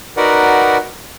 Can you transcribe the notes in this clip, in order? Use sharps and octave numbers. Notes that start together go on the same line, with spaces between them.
D#4 F#4 A#4 B4 D5 F#5